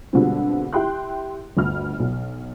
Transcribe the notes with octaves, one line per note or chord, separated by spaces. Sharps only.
B2 D3 F3 G3 G#3 C4
E4 G4 G5 C6 F#6
G1 D2 F6
B1